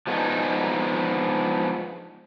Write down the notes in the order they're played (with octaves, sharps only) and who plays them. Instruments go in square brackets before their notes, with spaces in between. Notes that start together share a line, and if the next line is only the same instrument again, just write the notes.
[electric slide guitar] F3 G#3 B3 C4 D4 D#4